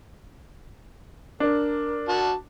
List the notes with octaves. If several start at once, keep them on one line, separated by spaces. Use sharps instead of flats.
D4 A#4
F#4 A5